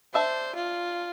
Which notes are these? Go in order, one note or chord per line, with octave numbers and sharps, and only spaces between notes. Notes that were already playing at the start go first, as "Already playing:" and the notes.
D4 C5 E5 A5
F4